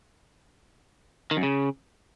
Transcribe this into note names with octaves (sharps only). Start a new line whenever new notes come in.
D#3
F#2
C#3